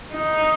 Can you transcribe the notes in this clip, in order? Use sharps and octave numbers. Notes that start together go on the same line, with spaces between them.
D#4